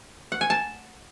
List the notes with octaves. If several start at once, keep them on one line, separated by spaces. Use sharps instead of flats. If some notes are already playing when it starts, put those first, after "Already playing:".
F#5
G#5
A5